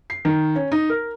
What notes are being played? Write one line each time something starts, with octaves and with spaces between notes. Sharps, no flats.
C7
D#3
C#4
D#4
A#4